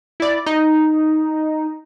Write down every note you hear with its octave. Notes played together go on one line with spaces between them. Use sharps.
E4 D5
D#4